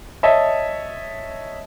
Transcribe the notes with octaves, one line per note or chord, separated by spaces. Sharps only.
C#5 D#5 E5 A5